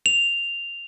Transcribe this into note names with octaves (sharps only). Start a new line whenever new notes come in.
F7